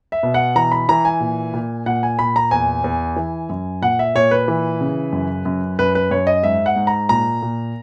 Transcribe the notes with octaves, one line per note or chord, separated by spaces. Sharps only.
E5
B2
F#5
E3 A#5
B5
E3 A#5
G#5
A#2
A#2
A#2 F#5
G#5
A#2 B5
A#5
E2 G#5
E2
E3
F#2
A#2 F#5
E5
A#2 C#5
B4
E3
C#3
F#2
F#2
F#2 B4
B4
F#2 C#5
D#5
G#2 E5
F#5
G#2
A#5
A#2 A#5
A#2